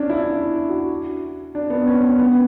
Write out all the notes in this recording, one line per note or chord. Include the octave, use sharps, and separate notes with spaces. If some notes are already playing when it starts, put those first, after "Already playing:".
Already playing: C#4 D4
E4
E4
F#4
D4
B3
C#4
C#4
B3